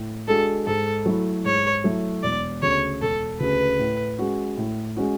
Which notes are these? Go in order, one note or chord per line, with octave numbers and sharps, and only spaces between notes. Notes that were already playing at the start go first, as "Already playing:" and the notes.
Already playing: A2
G#3 D4 F#4 A4
G#2 A4
F#3 A3 E4
G#2 C#5
F#3 A3 E4
E1 D5
D2 C#3 C#5
E1 A4
D2 C#3 B4
A2
G#3 C#4 F#4
A2
G#3 C#4 F#4